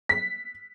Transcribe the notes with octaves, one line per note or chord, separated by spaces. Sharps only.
B6